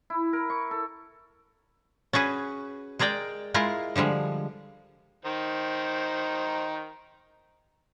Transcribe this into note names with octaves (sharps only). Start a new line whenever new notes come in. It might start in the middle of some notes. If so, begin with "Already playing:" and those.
E4
A#4
C#6
A4
C#4 F#4 G#4 B4
G#3 G#4 A#4 D5 G5
G#3 E4 F4 A#4
D3 F3 G3 G#3
D#3 D#4 C5